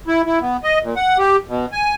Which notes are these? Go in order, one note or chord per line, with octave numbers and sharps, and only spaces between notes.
E4
E4
B3
D#5
A#2
F#5
G4
B2
G#5